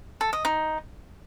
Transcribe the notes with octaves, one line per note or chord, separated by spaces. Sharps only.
A4
D#5
D#4